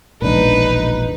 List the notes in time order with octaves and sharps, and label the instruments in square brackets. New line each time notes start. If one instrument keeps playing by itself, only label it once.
[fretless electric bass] E1 A#1 D4 [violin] D#4 B4